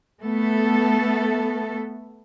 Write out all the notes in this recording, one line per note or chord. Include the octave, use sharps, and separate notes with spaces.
A3 B3 A4